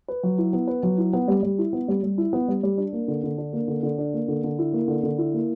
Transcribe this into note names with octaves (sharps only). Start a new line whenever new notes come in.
B4
F#3
E4
B3
B4
F#3
E4
B3
G3
G3
E4
B3
G3
G3
E4
B3
G3
G3
D4
A#3
D3
D3
D4
A#3
D3
D3
D4
A#3
D3
D3
E4
A#3
D3
D3
E4
A#3